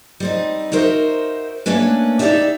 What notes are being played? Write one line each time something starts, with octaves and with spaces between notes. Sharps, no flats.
G3 C4 D#4
D#4 F#4 A#4 C5 E5
A3 A#3 C#4 D4 B4
D#4 E4 G4 G#4 D5 E5